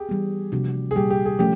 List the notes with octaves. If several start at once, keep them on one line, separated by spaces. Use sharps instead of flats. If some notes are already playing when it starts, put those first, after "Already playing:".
Already playing: G4 G#4
E3 G3 B3
C3 F3 A#3 D4 F#4
G#4
A#2 G3 A#3 G4
G4
G#4
F3 A3 C#4 G4